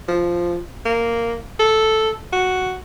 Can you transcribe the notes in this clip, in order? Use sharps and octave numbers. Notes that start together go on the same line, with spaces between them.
F3
A#3
A4
F#4